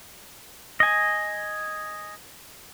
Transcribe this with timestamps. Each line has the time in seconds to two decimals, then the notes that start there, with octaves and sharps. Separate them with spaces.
0.80 D#5 G#5